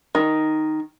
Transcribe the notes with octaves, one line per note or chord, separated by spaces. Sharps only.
D#3